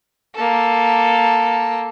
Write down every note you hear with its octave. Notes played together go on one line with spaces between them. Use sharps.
A#3 A4